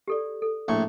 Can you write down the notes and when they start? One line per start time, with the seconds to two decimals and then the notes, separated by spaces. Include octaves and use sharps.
0.08 G4 A4 D5
0.42 A4
0.68 A#1 A2 C#6